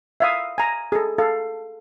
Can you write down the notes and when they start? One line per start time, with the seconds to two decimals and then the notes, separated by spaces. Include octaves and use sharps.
0.20 E5 F5 D#6
0.58 G#5 A#5
0.92 G#4 A4
1.18 A4 F5